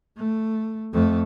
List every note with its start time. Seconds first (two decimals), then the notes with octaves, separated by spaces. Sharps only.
0.17 A3
0.93 F2 A3